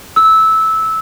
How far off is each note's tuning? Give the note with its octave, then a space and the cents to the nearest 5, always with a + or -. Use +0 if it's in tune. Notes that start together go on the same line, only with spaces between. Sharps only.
E6 -15